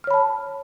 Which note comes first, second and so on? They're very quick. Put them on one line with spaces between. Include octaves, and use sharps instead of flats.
F6 C#5 B5 A5